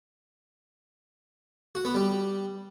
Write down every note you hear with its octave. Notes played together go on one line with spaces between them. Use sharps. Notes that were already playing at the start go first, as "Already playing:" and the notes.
F#4
B3
G3